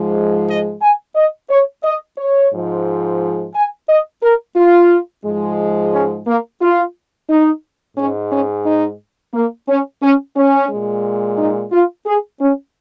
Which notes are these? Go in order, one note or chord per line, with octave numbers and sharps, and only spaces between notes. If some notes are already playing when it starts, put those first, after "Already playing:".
Already playing: G#2 F3 G#3
D#5
G#5
D#5
C#5
D#5
C#5
G#2 F3 G#3
G#5
D#5
A#4
F4
G#2 F3 G#3
C#4
A#3
F4
D#4
G#2 G#3 C#4
C#4
D#4
A#3
C#4
C#4
C#4
A#2 G#3
D#4
F4
G#4
C#4